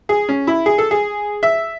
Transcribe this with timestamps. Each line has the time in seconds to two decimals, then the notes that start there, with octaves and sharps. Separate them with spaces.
0.09 G#4
0.29 C#4
0.47 E4
0.66 G#4
0.78 A4
0.91 G#4
1.43 E5